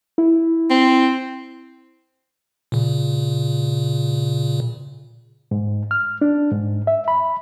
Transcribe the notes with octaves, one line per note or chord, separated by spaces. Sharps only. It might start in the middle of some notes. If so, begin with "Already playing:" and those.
E4
C4
A#2 C#3
G#2
F6
D4
G#2
E5
B5